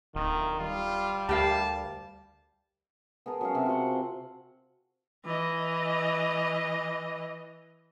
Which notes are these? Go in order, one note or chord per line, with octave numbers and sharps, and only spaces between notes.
D1 D#3 F4
G3 F4
D2 G4 A#4 F5 A5
B3 G#4 A#4 A5
F#3 C#4 F5
C3
F4 F#5
F#4
E3 D#5